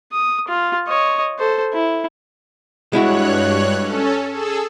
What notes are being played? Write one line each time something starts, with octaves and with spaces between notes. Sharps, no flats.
D#6
F4
C#5 D#5
A4 C5
E4
G2 G#3 E4 F#4 C#5 F#6
C#4 A4
G#4 A4 E6